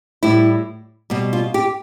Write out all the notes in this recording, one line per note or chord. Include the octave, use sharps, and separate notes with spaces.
A2 G3 E4
B2 G3
F4
G4